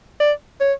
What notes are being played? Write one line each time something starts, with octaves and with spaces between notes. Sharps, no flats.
D5
C#5